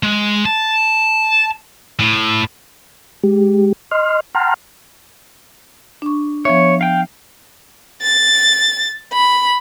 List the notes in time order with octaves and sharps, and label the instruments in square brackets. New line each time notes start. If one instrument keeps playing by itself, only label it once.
[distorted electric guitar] G#3
A5
A2
[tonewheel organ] G#3 G4
D#5 C6 F6
F#5 G5 A5 A#5 C6 F6
[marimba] D4 C#6
[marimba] F3 B3 E5 [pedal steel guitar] C#5
[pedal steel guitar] F5 G5
[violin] A6
B5